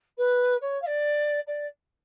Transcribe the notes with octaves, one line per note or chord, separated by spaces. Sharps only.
B4
C#5
F5
D5
D5